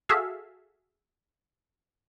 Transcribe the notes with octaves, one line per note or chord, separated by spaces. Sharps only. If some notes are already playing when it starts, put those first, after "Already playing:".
F#4 G#4 A4 E5 F5